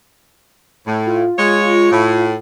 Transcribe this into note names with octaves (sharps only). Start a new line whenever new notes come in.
A2
F4
G#3 C#5
A2